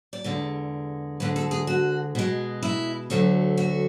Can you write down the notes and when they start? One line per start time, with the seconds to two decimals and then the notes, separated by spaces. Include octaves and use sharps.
0.13 D5
0.24 E2 D3 G#3
1.20 D2 D3 G#3 B4
1.36 A4
1.51 G#4
1.67 F#4
2.15 B2 G#3
2.62 E4
3.10 D2 D3 F#3 A3
3.57 F#4